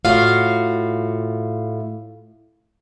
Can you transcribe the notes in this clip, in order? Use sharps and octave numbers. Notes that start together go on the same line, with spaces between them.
A2 F4 F#4 F5